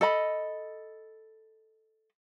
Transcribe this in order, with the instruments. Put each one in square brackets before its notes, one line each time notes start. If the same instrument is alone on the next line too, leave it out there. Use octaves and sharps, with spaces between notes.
[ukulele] A4 D#5 B5